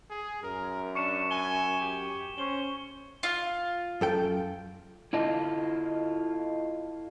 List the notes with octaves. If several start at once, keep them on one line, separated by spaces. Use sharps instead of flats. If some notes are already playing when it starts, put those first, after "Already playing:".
G#4
F#2 A#4
D4 C#6 C#7 E7
G#5 G7
G4
C#4 C5 C#6 G7
F4
F#2 A4 G5
E4 F4 A4 D#5